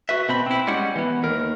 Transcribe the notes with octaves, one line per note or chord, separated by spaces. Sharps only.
F#4 B4 E5
B2 C4 B5
C4 E4
G3 G#3 C#4 E4 F#5
E3 B3
D#2 A#4